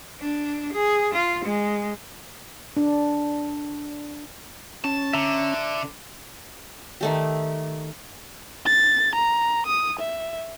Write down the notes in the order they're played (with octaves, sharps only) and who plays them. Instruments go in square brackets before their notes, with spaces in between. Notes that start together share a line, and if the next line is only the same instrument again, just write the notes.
[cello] D4
G#4
F4
G#3
[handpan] D4
[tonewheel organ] C#4 [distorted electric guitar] A5
[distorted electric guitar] D3 [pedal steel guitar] E5 A#5
[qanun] D#3 A3 G4
[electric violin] A6
A#5
D#6
E5